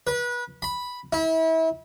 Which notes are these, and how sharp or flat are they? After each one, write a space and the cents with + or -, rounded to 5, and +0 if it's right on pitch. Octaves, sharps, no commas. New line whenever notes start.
B4 -30
B5 -5
E4 -30